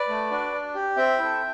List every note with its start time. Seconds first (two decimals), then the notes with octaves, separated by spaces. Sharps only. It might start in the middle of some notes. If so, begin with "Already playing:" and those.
Already playing: B4 D5
0.08 A3
0.31 D4 F#4
0.53 D4
0.75 G4
0.97 C4 E5 G5
1.19 E4 A4